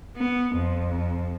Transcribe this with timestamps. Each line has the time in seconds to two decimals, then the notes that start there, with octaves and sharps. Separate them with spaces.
0.17 B3
0.56 F2